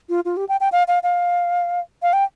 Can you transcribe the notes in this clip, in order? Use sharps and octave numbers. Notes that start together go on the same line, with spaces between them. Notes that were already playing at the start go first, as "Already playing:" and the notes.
F4
F4
G4
G5
G5
F5
F5
F5
F5
G5